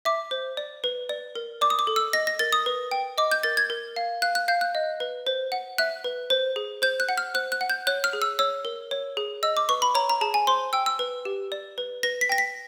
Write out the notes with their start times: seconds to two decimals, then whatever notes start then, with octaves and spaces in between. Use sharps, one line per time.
0.05 E5 D6
0.31 C5
0.57 D5
0.84 B4
1.09 D5
1.35 A#4
1.61 D5 D6
1.70 D#6
1.79 D6
1.87 A4
1.96 E6
2.13 D#5 A#6
2.27 A#6
2.39 A#4 A6
2.52 D#6
2.66 B4
2.91 G5
3.18 D#5 D6
3.31 G6
3.43 A#4 A6
3.57 G#6
3.70 A#4
3.96 F5
4.22 F5 F#6
4.35 F#6
4.48 F5 G6
4.61 F#6
4.75 D#5
5.00 B4
5.27 C5
5.52 F#5
5.78 E5 F#6
6.04 B4
6.30 C5
6.56 G#4
6.82 C5 G6
7.00 F#6
7.09 F#5
7.17 F6
7.34 C5 F#6
7.52 F#6
7.61 F#5
7.70 G6
7.87 C#5 F#6
8.04 F6
8.13 G#4
8.22 E6
8.39 C#5 E6
8.65 A#4
8.91 C#5
9.17 G#4
9.43 D#5 E6
9.57 D6
9.69 B4 C#6
9.82 B5
9.95 C#5 A#5
10.09 A#5
10.21 G#4 A5
10.34 G#5
10.47 C5 C6
10.73 G5 E6
10.86 E6
10.99 B4
11.25 G4
11.52 D5
11.78 B4
12.03 B4 A#6
12.21 B6
12.29 G5 A#6
12.38 B6